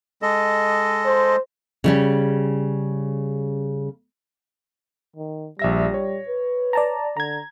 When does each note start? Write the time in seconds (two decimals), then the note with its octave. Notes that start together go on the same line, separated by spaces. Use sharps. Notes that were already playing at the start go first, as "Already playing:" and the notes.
0.22 G#3 A4 D#5
1.06 C5
1.84 C#3 G3 C#4
5.16 D#3
5.59 A#1 G3 E5 A#6
5.94 C#5
6.28 B4
6.73 D5 A5 A#5
7.17 D3 A#5 G#6